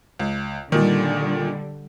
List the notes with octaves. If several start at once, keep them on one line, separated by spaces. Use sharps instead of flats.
C#2
A#2 D3 D#3 G3